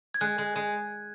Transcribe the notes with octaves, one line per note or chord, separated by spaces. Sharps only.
G#6
G#3 F#6
G#3
G#3